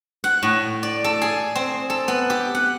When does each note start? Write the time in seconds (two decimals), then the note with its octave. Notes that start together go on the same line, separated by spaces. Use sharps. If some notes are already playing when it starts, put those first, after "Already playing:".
0.24 F#5
0.43 A2
0.83 D5
1.04 A4
1.21 G#4
1.55 C4
1.90 A4
2.08 B3
2.30 G4
2.55 F#5